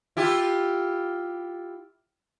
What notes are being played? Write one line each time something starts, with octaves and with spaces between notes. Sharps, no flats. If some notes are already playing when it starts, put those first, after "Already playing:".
E4 F4 G4